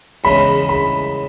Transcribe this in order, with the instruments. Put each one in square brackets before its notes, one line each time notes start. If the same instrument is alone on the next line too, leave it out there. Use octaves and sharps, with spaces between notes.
[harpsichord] E2 C#3 E3 G#3 C#4 [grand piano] B5
[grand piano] B5